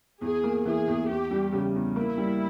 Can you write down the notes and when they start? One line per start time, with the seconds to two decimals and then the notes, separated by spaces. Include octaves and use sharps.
0.21 E2 G#4
0.44 A#3
0.66 E3 G#4
0.87 E2
1.09 E2 G4
1.31 G3
1.53 C#3
1.75 E2
1.96 A#3 E4
2.18 G3